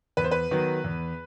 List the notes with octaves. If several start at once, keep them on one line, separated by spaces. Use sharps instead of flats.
E2 B4
C5
B4
D#3 F#3 B3
E2